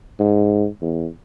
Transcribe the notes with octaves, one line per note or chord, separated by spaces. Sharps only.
G#2
E2